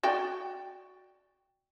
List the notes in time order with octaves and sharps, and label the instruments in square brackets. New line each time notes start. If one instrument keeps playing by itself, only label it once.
[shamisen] F#4 D5 G5